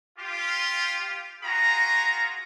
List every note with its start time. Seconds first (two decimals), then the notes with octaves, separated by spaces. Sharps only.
0.18 F4 G4
1.43 F4 F#4 G#4 A#5